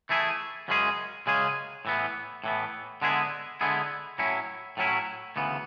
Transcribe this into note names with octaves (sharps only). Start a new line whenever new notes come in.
E3 A3 E4 G#4
F#2 C#3 G#3 C#4 G#4
F#2 C#3 G#3 C#4 G#4
A2 E3 B3
A2 E3 B3
D3 G#3 B3 E4 G#4
D3 G#3 B3 E4 G#4
A2 F#3 C#4 E4
A2 F#3 C#4 E4
D2 C#3 E3 B3